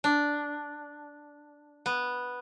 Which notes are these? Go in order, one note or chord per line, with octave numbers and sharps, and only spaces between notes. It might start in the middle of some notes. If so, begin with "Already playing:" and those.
D4
B3